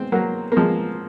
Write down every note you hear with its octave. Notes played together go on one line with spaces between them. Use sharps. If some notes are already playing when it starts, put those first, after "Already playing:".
Already playing: G#3 C4
F#3 A#3
A#3
F3 G#3